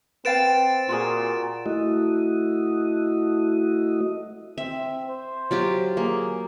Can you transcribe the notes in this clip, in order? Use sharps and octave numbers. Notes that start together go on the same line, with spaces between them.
C4 B4 F5 G5 A6 D7 E7
A#2 F4 F#4 G#4
A3 E4 F#4 D#5
C4 E5
C5
F#3 F4 G4
A#3 G#4